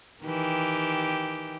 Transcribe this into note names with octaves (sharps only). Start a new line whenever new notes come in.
D#3 E3 G4